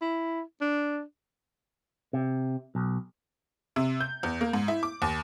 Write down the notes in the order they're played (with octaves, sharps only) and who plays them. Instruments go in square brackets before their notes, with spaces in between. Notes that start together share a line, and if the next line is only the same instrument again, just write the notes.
[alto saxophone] E4
D4
[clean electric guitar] C3
B1
[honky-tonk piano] C3
G6
E2
A#3
G#2
E4
D6
D#2